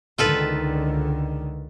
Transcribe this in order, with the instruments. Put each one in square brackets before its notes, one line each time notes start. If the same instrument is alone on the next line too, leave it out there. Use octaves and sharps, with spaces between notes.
[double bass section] C#2 D3 D#3 [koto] F4 A4 B4